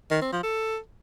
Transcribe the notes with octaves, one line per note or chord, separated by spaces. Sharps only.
D#3
C4
F3
A4